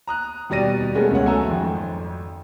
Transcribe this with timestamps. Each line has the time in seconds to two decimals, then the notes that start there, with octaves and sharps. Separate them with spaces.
0.07 A#5 D#6 F#6
0.50 D#2 B2 G3 D5 A#6 D#7
0.95 G#3 A3 B3 C#4 G#4 A#4
1.11 C#2 C#3 G#3 C#5 F#5
1.25 F#3 A3 G#5 A#5 E6
1.48 G#1 F2